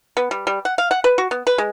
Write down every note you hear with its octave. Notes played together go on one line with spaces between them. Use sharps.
B3
G3
G3
F#5
F5
F#5
B4
F#4
B3
B4
G#3